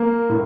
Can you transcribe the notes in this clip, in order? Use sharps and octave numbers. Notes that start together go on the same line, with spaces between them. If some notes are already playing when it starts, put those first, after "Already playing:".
Already playing: A#3
A2